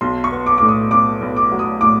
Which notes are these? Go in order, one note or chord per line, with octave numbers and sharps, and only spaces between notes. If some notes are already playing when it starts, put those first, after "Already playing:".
B1 C6
C#6
B3
D6
A2 D6
D#6
B1 D6
B1
D6
F#3
D#6
A2 D6